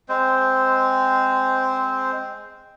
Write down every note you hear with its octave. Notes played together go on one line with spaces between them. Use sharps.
G#3 C4 C5